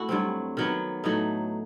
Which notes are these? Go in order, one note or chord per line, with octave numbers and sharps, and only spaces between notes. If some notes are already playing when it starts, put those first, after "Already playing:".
Already playing: A3 E4 F#4
G2 F#3 C4
D#3 F#3 B3
A2 F#3 A3 D#4